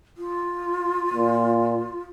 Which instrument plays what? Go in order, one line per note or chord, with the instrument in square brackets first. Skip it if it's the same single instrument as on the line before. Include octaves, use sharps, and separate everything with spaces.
[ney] F4
[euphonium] A#2